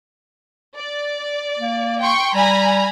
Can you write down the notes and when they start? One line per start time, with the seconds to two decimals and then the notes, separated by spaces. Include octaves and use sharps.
0.76 D5
1.59 A#3
2.01 G5 C6 C#6
2.35 G3 G#5 A#5 B5